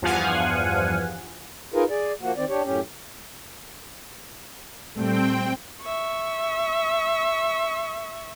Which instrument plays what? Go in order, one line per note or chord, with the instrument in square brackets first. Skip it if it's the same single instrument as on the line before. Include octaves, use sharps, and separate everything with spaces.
[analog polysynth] E2 G2 F3 F5 F#5 G#5
[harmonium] D#4 F4 G#4 A#4 B4
G#4 D5
F3 A#3 F#4
D#3 C4 D5
D4 G4 C#5
F#2 A2 C#4 G4
[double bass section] A#2 G3 A3 [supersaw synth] C4 G5
[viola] E5 C#6